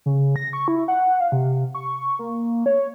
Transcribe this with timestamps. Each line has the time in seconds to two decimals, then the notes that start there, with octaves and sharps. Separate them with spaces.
0.06 C#3
0.36 A#6
0.53 C#6
0.68 E4
0.88 F#5
1.20 F5
1.32 C3
1.75 C#6
2.19 A#3
2.66 C#5